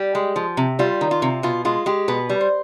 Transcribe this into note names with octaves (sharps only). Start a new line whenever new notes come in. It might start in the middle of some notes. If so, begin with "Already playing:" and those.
Already playing: G3 G4
G#3
F3
C3
G3 F4
D#3
F4
C3
B2 F4
G#3 F4
G#3 G4
B2 B4
G3
C5